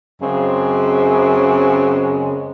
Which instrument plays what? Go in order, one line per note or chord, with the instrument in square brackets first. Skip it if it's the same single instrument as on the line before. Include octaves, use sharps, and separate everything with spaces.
[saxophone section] F#2 C#3 G#3 C4